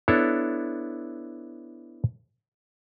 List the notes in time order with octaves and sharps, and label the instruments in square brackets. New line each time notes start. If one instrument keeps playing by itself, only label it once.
[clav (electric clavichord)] B3 D4 E4 A4 C#5